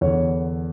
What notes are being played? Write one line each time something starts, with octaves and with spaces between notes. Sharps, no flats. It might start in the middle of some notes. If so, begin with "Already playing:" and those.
E2 D3 C#5